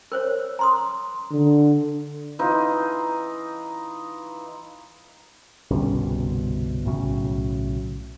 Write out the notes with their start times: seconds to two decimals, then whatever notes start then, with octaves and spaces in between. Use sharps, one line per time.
0.12 A#4 C5 C#5
0.59 A#5 C6 D#6
1.31 D3
2.39 E3 D#4 F4
5.71 G1 C2 B2 C#4
6.85 B1 A2 C#3 F#3